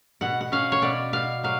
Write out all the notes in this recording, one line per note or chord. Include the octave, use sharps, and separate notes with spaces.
B2 F#5
F#5
C#4 F5
C#5
B2 D5
B2 F5
F#3 F5